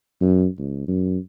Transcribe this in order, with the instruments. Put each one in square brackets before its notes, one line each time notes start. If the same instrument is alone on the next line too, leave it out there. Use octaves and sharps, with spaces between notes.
[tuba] F#2
C#2
F#2